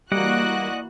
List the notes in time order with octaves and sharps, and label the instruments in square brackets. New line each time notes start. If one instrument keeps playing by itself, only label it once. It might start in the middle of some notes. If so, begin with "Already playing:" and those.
[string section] E3 F#4 F#6 [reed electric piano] G3 [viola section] A#3 [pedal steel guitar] D5 D#5 F#5